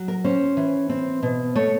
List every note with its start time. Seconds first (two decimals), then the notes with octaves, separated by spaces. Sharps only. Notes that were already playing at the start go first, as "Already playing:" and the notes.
Already playing: F#3
0.08 A#4
0.24 C#4 C5
0.57 E3
0.89 C4
1.23 B2
1.55 A3 C#5